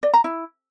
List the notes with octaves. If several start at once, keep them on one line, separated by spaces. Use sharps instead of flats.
D5
A#5
E4